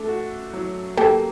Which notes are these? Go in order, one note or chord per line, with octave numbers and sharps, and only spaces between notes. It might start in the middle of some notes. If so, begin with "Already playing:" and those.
Already playing: A3 D4 A4
F#4
F#3
A#3 G4 A4